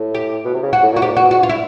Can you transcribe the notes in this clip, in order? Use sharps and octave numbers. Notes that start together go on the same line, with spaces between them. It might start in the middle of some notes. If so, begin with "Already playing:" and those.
Already playing: A2
G4
B2
C3
C#3
F#4
A2
A#2
F#4
G#2 G4
A#2
F#4
B2
G#2 F#4
G2 F4
E4